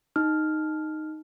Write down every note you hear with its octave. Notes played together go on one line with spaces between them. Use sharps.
D#4 F6